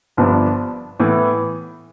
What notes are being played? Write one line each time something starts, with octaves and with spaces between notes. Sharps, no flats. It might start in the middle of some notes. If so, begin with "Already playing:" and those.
G1 G2 F3 B3 D4
A2 E3 B3